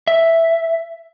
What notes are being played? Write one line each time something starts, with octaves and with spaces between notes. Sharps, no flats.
E5